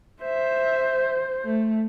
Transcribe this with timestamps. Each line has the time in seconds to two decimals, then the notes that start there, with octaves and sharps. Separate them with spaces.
0.23 C5 E5
1.45 A3